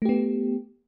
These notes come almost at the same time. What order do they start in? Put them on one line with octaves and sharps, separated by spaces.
A3 G4 B3